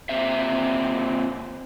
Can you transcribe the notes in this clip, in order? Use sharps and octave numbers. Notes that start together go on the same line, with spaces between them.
A#2 C4 C5 E5